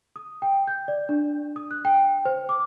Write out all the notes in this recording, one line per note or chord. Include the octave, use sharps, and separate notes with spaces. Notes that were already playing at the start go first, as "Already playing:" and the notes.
D#6
G5
G6
D5
D4
D#6
F#6
G5
C5
D6